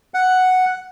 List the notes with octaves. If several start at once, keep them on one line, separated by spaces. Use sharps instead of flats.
F#5